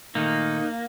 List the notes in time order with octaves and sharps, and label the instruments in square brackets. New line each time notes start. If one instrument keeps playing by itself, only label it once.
[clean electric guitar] A#2 D#3 A3 [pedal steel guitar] A#3 [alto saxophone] D#4